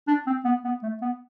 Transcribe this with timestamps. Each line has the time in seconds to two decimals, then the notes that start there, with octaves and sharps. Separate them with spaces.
0.07 D4
0.26 C4
0.45 B3
0.64 B3
0.83 A3
1.02 B3